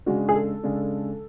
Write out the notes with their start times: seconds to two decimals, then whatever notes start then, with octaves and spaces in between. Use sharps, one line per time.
0.06 C#3 G#3 D4 F#4
0.29 G#4
0.35 A4
0.63 C#3 G#3 D4